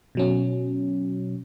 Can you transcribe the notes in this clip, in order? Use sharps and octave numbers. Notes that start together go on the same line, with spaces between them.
B2 F#3 C#4